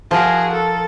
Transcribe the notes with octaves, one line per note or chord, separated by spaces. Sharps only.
F3 E4 F#4 G#4 A#4
A4